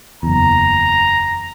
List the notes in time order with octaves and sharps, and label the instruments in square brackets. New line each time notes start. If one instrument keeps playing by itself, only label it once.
[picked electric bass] F#1 E2 [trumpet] A#5